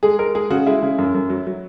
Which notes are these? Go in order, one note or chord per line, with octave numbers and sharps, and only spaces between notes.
G#3 G#4
G#3 A#4
G#3 G#4
C#3 F#4
G#3 E4
C#3
F#2
F#2
F#3
F#3